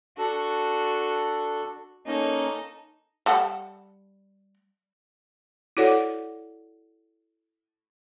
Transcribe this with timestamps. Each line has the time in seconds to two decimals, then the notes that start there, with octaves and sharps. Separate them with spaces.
0.18 D4 F#4 A4
2.06 A#3 C#4 D#4 A4
3.26 G3 A4 F#5
5.77 E4 F#4 A4 C#5 D5 F#5